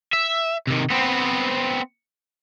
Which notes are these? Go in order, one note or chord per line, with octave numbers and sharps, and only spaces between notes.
E5
C3 D#3
B3 C4